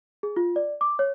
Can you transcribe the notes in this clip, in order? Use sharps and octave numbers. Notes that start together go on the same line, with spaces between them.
G#4
F4
D5
D6
C#5